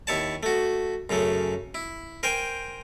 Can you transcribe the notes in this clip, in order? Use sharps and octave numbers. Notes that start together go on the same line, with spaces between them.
D#2 E4 C#5 A5
A3 F#4
F#2 C#3 A3
E4
A#4 C5 G5 G#5 C6